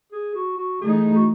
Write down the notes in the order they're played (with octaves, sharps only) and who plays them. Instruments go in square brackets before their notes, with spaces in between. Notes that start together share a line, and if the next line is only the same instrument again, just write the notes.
[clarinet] G#4
F#4
F#4
[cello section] E3 A3 D#4 [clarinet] G#4
[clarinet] F#4